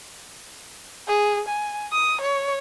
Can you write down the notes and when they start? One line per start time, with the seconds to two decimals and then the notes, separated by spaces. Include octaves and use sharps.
1.08 G#4
1.48 G#5
1.92 D#6
2.21 C#5